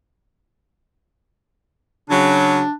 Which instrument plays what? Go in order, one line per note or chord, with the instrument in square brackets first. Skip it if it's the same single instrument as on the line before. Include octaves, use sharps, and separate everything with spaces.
[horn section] C#3 F#3 [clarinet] D4